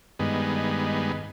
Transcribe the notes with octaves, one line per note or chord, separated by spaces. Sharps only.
G2 D#3 G#3 B3